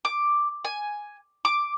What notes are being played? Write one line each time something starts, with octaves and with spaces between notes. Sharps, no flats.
D6
G#5
D6